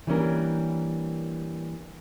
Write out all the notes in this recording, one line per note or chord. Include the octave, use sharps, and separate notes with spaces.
E3 G3 A#3 C#4 D4 A#4